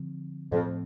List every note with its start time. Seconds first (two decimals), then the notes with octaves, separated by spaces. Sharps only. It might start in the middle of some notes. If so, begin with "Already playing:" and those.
Already playing: D3 F3 C4
0.52 F2 A2 F3 C4